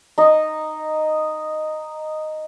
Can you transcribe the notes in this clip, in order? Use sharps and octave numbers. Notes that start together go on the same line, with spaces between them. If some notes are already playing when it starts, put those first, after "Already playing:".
D#4 D#5